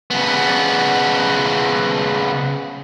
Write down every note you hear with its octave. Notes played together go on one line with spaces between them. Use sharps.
C#3 B3